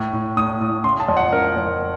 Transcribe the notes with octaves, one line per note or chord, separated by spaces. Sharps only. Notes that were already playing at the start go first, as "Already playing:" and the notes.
Already playing: A2
A2
A2 D#6
A2
C#3 C6
A5
F2
F#5
C#3 A#4
F2